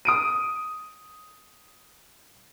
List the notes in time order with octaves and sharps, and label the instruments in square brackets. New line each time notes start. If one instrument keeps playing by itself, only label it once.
[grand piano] D#6 D7 D#7